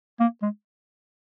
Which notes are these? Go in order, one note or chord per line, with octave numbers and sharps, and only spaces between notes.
A#3
G#3